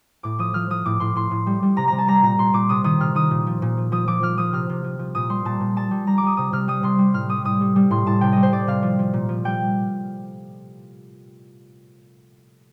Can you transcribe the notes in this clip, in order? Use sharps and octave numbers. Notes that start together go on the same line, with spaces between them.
A2 D6
F3 D#6
F3 F6
F3 D#6
A2 D6
A2 C6
A2 C6
A2
G3
G3
C3 A#5
C3 A#5
A5
G3 A#5
A#2 A#5
A#2 C6
A#2 D6
C3 D#6
D#3 D#6
C3 F6
D#3 D#6
A#2
F3
A#2
F3
F3 D#6
F3 D6
F3 F6
F3 D#6
C3 F6
C3
F3
F3
A#2 D#6
G3 C6
A#2 A5
A#2
G3 A5
G3
G3 A#5
D6
G3 D#6
C3 D#6
C3 F6
G3 D#6
C3 C6
G3
A2 F6
G3 D#6
A2 D#6
G3
G3
A2 C6
A2 A5
C3 G5
G3 D#5
C5
C3 D5
C3 F5
F3
F3
A#2
F3
G3 G5